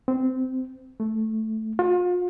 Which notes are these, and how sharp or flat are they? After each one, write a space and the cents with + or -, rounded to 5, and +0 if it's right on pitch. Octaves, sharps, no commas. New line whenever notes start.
C4 -15
A3 -5
F4 +40